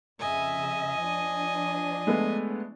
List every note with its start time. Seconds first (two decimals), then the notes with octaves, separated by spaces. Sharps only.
0.19 F2 C#3 D#5 E5 G#5
0.99 F3 D4
2.07 G#3 A3 B3